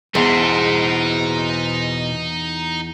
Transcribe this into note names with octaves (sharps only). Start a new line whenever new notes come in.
E2 B2 D#4 G#4 C5 A5